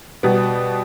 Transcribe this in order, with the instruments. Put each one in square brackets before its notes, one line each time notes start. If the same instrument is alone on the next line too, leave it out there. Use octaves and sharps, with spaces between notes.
[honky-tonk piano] B2 G3 B3